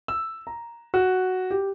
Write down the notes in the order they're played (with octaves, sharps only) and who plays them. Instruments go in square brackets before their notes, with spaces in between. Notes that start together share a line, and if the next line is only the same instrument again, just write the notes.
[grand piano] E6
A#5
F#4
G4